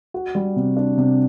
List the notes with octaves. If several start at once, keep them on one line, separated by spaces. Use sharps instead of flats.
F#4
G3
C3
D4
C3